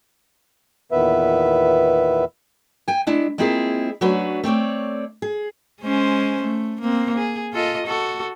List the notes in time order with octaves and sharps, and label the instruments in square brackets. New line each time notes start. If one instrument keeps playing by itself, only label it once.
[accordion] E2 A#2 D#3 B3 B4 E5
[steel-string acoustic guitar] G5 G#5
G#3 D4 E4
G#3 A#3 C4 E4 F4 G#4
F#3 A3 C#4 D4 F#4 B4
A3 C4 C#5 D5
G#4
[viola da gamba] G#3 C#4 C5
A3
A#3 C4
G#4
F4 A4 D#5
F#4 A4